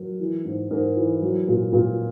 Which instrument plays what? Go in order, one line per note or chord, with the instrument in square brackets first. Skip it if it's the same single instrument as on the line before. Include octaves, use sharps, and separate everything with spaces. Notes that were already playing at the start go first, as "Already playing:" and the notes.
Already playing: [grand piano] F#3 A#4
E3
G#2
G#2 A#4
E3
F#3
A#2
A#2